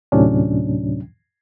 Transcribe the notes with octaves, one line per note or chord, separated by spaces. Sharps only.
D2 A2 C3 F#3 C#4 D4